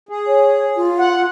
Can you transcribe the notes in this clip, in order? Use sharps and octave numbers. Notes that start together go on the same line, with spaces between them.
G#4
C#5
F4
F#5